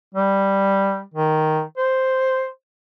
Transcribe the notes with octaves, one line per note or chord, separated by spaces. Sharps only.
G3
D#3
C5